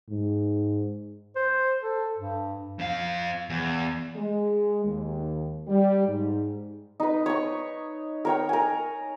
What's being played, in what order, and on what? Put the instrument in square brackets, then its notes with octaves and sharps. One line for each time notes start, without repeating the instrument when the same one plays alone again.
[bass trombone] G#2
[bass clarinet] C5
A4
G2
[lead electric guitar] F2 F5
E2
[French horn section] G#3
D#2
G3
G#2
[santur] D#4 B4
C#5 C#6
A#4 C#5 G5
A#4 G#5